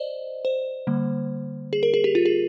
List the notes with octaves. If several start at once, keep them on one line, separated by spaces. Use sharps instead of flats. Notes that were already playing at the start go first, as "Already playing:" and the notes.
Already playing: C5 D5 D#5
C5
D3 G3 A#3
G#4
A#4
G#4
G4
F4
G#4